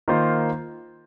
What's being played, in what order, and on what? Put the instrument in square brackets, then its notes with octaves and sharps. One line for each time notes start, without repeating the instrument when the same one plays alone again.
[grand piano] D#3 A#3 F4 C5